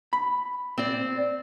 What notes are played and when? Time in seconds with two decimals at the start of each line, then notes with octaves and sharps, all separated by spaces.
0.13 B5
0.78 C4 D5